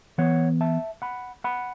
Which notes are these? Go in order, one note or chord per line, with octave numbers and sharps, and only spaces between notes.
E3 B3 C#5 F#5
E5 A5
F#5 B5
F#5 B5